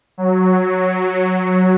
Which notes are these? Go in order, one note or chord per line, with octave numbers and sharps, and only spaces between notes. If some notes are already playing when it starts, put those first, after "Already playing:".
F#3